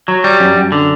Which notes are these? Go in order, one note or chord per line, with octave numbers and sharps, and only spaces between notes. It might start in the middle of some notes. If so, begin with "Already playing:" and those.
F#3
G3
F#2
F#2
D3